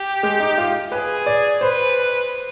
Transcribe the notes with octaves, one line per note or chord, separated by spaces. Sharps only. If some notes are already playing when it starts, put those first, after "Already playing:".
Already playing: G4
G#3
D#4
F4
G#4 B4
D5
B4 C5